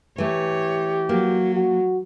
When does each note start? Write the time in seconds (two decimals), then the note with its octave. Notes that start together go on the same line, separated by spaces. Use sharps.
0.18 E3 A3 G4 C#5
1.09 F#3 A#3 F#4
1.55 F#4